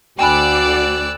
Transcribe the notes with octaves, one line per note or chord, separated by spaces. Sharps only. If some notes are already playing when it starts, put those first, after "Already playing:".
D2 F#4 D5 G5 G#5 B5 E6 F#6